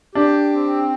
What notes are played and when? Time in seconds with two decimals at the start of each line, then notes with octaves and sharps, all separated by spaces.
0.15 D4 G4
0.53 C4